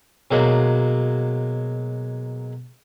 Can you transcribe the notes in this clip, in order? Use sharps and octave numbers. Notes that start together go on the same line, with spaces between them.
B2 F#3 G#3 A#3